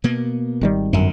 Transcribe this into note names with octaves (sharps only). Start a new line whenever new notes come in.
B2 A#3 B3
G#1 D#3 G3
G1 F#2 D3